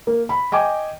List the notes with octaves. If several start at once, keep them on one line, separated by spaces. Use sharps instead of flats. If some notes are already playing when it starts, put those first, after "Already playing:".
A#3
B5
D#5 G5 G#5 D6